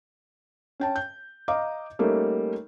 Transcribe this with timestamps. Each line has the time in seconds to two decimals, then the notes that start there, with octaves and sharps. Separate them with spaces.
0.80 C#4 G5 A5
0.96 G6
1.48 D#5 F5 A#5 D6
1.99 G3 A3 A#3 C#4 D#4